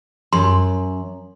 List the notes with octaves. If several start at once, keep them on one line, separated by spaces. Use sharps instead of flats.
F#2 C6